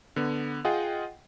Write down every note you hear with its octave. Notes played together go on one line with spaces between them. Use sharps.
D3 B3
F4 G#4 D#5 F#5 G5